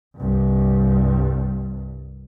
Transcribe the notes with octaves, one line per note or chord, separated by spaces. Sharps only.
C2 G2